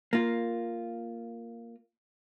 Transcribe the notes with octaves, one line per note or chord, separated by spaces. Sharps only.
A#3 F4